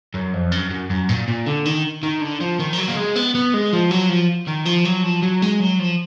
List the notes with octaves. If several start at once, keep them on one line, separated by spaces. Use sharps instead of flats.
F#2
F2
F#2
F#2
F#2
A#2
A#2
D3
D#3
D#3
D3
F3
D#3
F3
F#3
A#3
G#3
B3
B3
G#3
F3
F#3
F3
D#3
F3
F#3
F3
F#3
G#3
F#3
F3